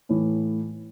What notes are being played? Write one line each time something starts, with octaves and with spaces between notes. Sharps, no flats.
A2 E3